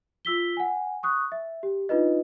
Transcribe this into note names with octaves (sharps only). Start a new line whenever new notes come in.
F4 E6 B6 G7
F#5 G#5
C#6 D#6 F#6
E5
G4
D4 D#4 F4 B4 D#5